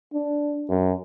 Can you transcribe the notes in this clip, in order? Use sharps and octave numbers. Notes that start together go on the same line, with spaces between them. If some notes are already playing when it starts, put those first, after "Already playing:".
D4
F#2